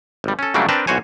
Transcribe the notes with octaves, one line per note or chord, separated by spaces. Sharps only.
G#1 G3
C#4 A4
C#3 F#3 G3 A3 A#3 D4
C4 D4 A#4 B4 G5 A5
B1 E3 F#4 C5 C#5 G#5